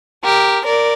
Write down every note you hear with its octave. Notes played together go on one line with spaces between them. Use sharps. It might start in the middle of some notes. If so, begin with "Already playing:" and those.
G4 A#4
A#4 D5